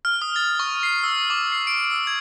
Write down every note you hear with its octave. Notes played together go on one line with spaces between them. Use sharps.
F6
D#6
A6
C#6
C7
E6
D6
C7
D7
E6
G#6